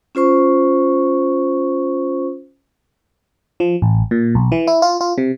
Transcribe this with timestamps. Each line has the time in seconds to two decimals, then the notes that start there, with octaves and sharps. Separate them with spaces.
0.15 C#4 F4 C5 C#6
3.60 F3
3.82 A1
4.11 A#2
4.35 B1
4.52 E3
4.67 E4
4.82 F4
5.01 F4
5.18 C3